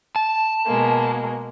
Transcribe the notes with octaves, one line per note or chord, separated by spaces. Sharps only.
A5
B2 G#3 A#3